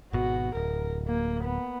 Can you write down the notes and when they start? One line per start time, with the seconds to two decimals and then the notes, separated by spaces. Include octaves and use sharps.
0.13 G#1 B2 F#4
0.55 D1 A#4
1.08 A#3
1.44 B3